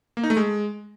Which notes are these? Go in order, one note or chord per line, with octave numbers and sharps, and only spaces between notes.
A#3
D#4
A3
G#3